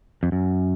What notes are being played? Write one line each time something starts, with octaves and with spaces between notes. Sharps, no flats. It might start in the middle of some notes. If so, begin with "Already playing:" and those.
F2
F#2